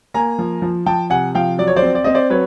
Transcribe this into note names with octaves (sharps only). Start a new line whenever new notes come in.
A#3 G#5 A#5
F3
F3
F3 G5 A5
C3 F#5 G#5
F3 F5 G5
F#3 D5
C#5
C5 D5
C4
D5
C4 D#5
C5 D5
F#3 B4 C#5